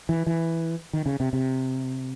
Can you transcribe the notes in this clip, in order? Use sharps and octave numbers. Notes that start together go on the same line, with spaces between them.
E3
E3
D#3
C#3
C3
C3